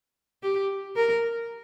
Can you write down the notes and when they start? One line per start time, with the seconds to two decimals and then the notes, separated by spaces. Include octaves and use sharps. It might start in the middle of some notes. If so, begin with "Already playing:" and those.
0.43 G4
0.96 A#4